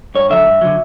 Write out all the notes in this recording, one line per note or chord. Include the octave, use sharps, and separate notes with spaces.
G2 C#5
D3 F#3 E5
G2
D3 F#3